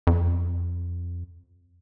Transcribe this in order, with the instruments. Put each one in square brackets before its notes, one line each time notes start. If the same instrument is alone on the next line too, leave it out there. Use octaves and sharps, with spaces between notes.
[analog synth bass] F2